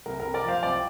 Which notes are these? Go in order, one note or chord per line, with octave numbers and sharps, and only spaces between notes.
C2 A#4
C3 A#4
A#4 D5
F3 C5 F5
C2 D5 G5